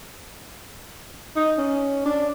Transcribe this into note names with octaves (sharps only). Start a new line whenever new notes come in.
D#4
C#4
D4